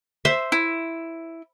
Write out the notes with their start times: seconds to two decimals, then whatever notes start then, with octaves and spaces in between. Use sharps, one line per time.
0.25 C5 E5
0.52 E4